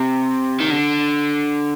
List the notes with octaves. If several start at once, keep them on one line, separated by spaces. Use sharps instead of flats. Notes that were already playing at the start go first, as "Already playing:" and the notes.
Already playing: C3
D#3
D3